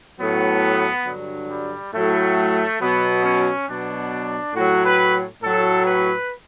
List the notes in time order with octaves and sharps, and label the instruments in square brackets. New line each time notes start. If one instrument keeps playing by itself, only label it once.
[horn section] A2 F#3 B3
G2 D3 F#3
G3
A2 F#3 A3
B2 F#3 B3
C#4
B2 F#3 D4
A2 F#3 F#4
B4
A2 F#3 A4
B4